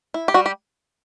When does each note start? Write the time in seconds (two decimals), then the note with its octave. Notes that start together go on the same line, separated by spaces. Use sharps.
0.14 E4
0.28 G4
0.34 G3 F#4
0.46 G4